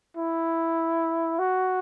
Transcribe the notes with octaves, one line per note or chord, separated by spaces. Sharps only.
E4
F#4